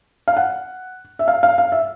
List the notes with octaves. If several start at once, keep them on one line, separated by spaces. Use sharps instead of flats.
F5
F#5
E5
F5
F5
F5
E5